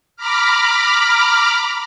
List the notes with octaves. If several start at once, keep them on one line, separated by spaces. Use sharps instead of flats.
A#5 B5 D6 F6